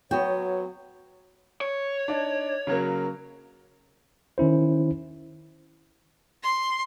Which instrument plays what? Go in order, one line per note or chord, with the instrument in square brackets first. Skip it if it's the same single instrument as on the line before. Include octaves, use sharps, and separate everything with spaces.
[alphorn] F#3 [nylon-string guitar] B3 F#4 G5 [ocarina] C#5
[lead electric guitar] C#5
[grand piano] D4 D#4
C#3 F#3 A#3
[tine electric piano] D#3 C#4 E4 C5
[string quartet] C6